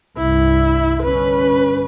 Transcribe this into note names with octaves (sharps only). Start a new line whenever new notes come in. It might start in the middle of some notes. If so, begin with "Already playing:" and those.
C2 G2 E4
G1 C#4 B4